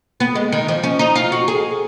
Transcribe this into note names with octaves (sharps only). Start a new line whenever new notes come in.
B3
G#3
D#3
F3
C#4
D#4
F4
F#4
G#4